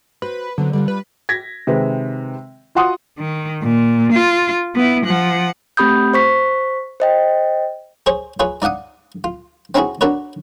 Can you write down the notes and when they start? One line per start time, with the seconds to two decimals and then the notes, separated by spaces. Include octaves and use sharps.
0.22 F#4 B4 C5
0.58 D3 F#3 B3 C4
0.73 D3 G3 D4 F4
0.88 B4
1.29 G#6 A#6 B6
1.67 C3 D#3 G#3 B4
2.75 F4 F#4 F#5 C6 D#6
3.19 D#3
3.63 A#2
4.13 F4
4.75 B3 E4
5.05 F3 F#5
5.77 A3 C4 G4 B5 D#6 G6
6.14 C5 C#6 B6
7.00 C5 D#5 G5
8.06 G#4 C5 C#5
8.40 F4 G#4 B4 C#5
8.62 D#4 D5 F5 F#5 D#6
9.24 F4
9.75 C4 C#4 D#4 E4 F#4 G#4
10.01 D4 F#4 A#4 B4 C#5